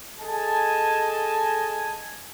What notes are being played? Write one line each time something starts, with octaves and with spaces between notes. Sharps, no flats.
G#4 A4 D#5 G#5 A5